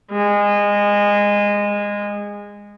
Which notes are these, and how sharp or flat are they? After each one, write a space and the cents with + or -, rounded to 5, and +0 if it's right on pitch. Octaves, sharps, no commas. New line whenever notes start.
G#3 -20